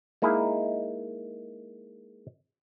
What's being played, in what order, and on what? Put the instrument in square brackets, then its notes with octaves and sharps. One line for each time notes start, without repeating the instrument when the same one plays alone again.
[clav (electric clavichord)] G#3 A#3 D#4 E4 G#4